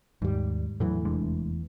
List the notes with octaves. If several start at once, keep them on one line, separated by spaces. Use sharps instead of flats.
D#2 G#2 G3
E2 A2 E3 F#3 A3
F1 G#3 D4